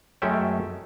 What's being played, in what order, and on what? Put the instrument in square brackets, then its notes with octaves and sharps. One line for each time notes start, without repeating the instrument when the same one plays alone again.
[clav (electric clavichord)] F#2 G#3 A3 C#4 E5 G5